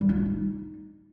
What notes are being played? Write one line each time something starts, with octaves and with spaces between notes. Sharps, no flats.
G3
F4
A3
D#4